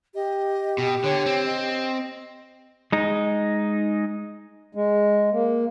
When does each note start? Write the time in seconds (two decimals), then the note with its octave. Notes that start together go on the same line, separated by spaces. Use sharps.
0.15 G4 D#5
0.78 B2
1.04 D3 C#5
1.26 C4
1.45 D#5
2.92 G#3 D#4
4.75 G#3
5.32 A#3